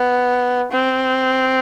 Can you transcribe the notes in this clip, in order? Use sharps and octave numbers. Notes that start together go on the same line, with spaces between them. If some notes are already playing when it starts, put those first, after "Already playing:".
Already playing: B3
C4